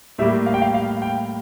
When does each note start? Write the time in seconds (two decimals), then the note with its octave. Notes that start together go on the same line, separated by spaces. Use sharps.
0.18 A2 G3 A#3 E5
0.46 F5
0.54 G5
0.62 F5
0.74 F5
1.02 G5